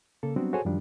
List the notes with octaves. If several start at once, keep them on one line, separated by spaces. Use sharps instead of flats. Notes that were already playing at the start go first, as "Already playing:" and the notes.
C#3 A#3 A4
F#3 G3 B3 C4 D4 F#4
F#4 G#4 A4 C5 C#5 G#5
F#2 D#3 F3 G3 D4